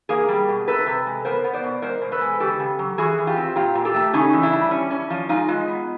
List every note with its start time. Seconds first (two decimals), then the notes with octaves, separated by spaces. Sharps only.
0.09 A#3 G#4 A#4
0.29 G3
0.48 B2
0.67 C3 A4 B4
0.86 C3
1.06 G#3
1.25 B3 A#4 C5
1.44 B3
1.53 C5 D5
1.64 B2
1.82 G#3 A#4 C5
2.01 B2
2.12 A4 B4
2.21 G#3
2.40 C#3 G4 A4
2.59 C#3
2.79 F#3
2.98 E3 F#4 G#4
3.18 E3
3.27 F4 G4
3.37 C4
3.56 A#2 F4 G4
3.75 A#2
3.85 G4 A4
3.94 A3
4.13 C#3 C#4 D#4
4.33 E3
4.43 D4 E4
4.53 G3
4.71 C#4
4.91 C#4
5.10 F3
5.29 G#3 D#4 F4
5.48 G#3
5.68 B3